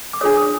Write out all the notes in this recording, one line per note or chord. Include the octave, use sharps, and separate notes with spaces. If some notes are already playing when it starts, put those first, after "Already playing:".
D6
D4 F4 G#4 C#5 D#6
D#6